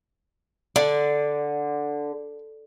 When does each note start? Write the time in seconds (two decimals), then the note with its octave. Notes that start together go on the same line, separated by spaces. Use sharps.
0.76 D3 D5